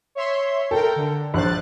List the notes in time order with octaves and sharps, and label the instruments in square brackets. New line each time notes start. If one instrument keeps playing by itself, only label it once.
[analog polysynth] C#5 E5 C6
[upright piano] A4 [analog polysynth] A#4 G5
[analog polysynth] D3
[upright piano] A#1 C5 [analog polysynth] F#6 A6